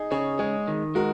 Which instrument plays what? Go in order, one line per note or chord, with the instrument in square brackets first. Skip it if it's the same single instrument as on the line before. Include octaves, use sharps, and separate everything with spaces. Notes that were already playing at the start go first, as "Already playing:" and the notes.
Already playing: [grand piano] D#4 G#4
[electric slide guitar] C#3 [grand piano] G#4 C#5
[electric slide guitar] G#3 [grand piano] G#4 C#5
[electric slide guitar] D#3
[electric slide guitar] G#3 [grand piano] F#4 A#4